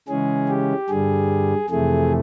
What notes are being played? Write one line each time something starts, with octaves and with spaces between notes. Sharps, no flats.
C#3 E3 G#3 C#4 G#4
G4
G2 D3 G3 G#4
F2 C3 E3 A3 G#4